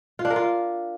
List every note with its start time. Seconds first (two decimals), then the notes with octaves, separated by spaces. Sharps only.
0.19 F4
0.25 D4
0.30 A#4
0.36 F4